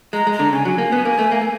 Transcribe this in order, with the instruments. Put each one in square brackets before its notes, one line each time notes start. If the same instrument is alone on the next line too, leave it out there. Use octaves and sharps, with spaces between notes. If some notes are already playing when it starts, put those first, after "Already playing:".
[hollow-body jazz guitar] G#3 [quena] A#5
[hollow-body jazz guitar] G#3
[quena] A#5
[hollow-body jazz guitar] D3
[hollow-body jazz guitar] C#3 [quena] G#5
[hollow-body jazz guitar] F#3
A#3
B3
A#3
A3
A#3
A3